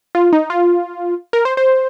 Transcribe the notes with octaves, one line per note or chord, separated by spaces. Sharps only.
F4
D#4
F4
A#4
C5
C5